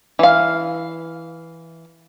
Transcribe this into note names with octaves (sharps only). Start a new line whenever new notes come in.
E3 F5